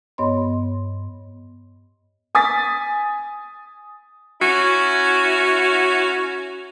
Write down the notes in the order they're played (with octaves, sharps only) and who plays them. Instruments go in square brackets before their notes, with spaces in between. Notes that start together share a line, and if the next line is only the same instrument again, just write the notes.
[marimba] G2 B3 C#5 D#5 B5 C6
[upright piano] G#5 D#6 A6 B6
[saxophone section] C#4 E4 F#4